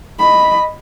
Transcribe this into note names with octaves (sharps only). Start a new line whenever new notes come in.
D#5 B5